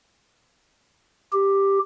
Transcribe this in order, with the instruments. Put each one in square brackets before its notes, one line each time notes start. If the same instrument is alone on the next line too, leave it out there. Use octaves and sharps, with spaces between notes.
[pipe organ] G4